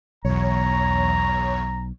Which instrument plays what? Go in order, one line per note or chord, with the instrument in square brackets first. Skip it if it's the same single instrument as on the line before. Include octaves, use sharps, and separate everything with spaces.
[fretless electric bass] B1 [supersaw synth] E2 C#5 [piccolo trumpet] A#5